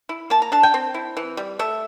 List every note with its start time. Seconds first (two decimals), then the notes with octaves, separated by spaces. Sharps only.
0.09 E4
0.30 A#3 A5
0.42 A#5
0.52 D4 A5
0.63 G5
0.74 C4
0.94 E4
1.17 E3
1.37 G3
1.59 A3 E5